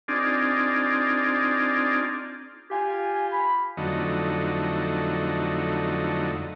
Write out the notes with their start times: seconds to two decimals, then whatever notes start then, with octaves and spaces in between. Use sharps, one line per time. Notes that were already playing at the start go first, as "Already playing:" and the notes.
0.08 C4 D4 D#4 F4 G#4 D5
2.71 F4 G4 G#5
3.32 B5
3.77 F2 D3 F#3 A3 D#4